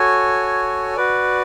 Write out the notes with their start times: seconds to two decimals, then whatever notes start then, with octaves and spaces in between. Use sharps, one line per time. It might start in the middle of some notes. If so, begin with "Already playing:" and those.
Already playing: F#4 A4 C#5 G#5
0.96 F#4 B4 D5